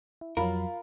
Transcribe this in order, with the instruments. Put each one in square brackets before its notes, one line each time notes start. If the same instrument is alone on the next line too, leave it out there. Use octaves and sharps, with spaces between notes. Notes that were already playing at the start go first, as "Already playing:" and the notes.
[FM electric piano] E4
[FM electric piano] F2 F#3 [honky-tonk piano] F4 B5 [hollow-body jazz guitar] A#4